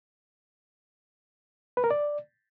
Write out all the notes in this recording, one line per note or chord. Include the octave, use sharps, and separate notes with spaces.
B4
A#4
D5